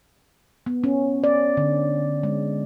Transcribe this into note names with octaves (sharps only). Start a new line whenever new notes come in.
B3
C#4
D5
D3
G#3